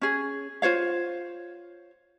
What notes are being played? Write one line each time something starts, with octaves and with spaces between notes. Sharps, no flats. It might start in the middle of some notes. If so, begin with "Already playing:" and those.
C#4 G#4
F4 C5 C#5 F5